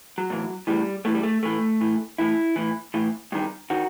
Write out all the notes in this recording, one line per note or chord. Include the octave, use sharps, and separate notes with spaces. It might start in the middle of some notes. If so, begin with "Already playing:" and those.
F#3
A2 E3
A2 E3 G3
A2 E3 A3
G3
A3
A2 E3 A3
A2 E3
A2 E3 E4
A2 E3
A2 E3
G2 D#3
D#3 F#4